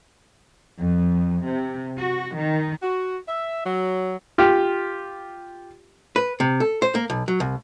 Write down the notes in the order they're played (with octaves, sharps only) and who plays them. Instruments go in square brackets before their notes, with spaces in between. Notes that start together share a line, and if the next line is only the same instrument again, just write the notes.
[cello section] F2
C3
F#4
D#3
[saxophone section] F#4
E5
F#3
[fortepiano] F4 G4
[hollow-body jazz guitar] B4
C3
A4
C5
A#3
B1
F#3
C2